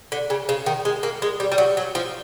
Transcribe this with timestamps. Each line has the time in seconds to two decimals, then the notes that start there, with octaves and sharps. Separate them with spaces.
0.12 D3
0.30 C#3
0.49 C#3
0.66 D#3
0.85 G#3
1.03 A#3
1.22 G#3
1.40 G3
1.52 G3
1.58 F#3
1.77 F#3
1.95 F3